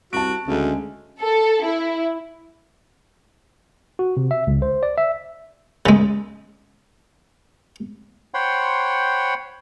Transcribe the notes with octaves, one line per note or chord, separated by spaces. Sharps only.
C2 F#4 A5 D7
D2 C#3 G#3
A4
E4
F#4
C3
E5
C#2
C5
D5
E5
C#3 G#3
C5 C#5 F#5 G5 B5 C6